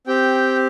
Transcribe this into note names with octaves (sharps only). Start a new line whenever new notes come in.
C4 G4 G5